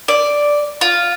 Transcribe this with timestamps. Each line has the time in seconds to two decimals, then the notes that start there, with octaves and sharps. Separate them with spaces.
0.08 D5
0.81 F4